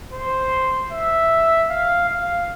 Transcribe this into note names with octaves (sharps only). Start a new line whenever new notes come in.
C5
E5
F5
F5